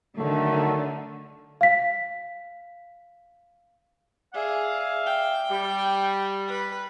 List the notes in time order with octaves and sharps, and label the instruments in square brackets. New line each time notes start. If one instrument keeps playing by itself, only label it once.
[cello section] D3 [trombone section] D#3 F#3 A3
[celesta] F5 B6
[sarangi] G#4 [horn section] D5 E5 F5
[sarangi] G5
[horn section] G3
[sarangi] B4